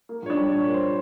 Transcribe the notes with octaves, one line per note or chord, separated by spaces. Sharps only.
A#3
A#1 C#5
D4 D5
G3
A#2 C#5
A#3
C5